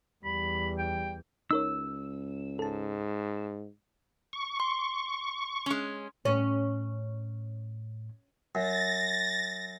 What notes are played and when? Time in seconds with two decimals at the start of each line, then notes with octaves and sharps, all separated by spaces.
0.25 E2 G3 B5
0.78 G5
1.51 C#2 D#4 A#4 C#5 E6
2.59 G#2 A4 A5
4.33 C#6
4.60 C6
5.66 G#3 C#4
6.25 A2 C#4
8.55 F#2 A6 A#6